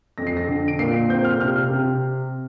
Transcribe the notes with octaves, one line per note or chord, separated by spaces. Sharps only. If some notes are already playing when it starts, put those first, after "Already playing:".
F2 A#6
C7
A#6
D3
D7
A#2 C7
C7
C4 G6
F6
C3 F6
C3